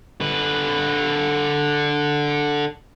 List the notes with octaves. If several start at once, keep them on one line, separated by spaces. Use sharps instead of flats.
D3 B4